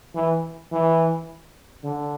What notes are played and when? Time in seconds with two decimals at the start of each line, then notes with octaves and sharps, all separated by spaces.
0.15 E3
0.72 E3
1.83 D3